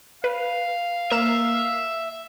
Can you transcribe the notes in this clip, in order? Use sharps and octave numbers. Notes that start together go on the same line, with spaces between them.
B4 F5
A#3 E5 E7